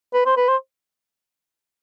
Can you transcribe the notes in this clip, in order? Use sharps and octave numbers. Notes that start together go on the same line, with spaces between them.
B4
C5
B4
C5